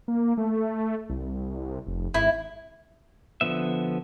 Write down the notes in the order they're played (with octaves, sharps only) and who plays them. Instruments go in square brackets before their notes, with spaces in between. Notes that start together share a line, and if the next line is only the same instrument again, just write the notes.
[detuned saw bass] A#3
A3
C2
F1
[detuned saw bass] G#1 [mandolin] E4
[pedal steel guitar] D3 F3 B3 E5